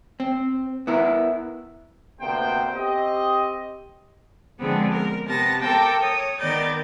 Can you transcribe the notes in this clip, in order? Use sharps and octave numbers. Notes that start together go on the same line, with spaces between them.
C4
B3 E4 A#4
D2 C3 A#3 B3 C5 G5
C4 G4 D#5
D3 F3 G#3 B3 C4 G#4
A#4
C3 B3 A5 A#6
A4 A#4 G5 A5 D6
C#5 D#6
D#3 B3 A#4 D5 G6 A6